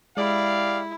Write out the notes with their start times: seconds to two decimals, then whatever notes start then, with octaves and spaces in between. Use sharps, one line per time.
0.17 G#3 E4 G4 D5 F5